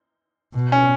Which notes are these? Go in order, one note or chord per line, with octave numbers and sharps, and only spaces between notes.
B2
C#4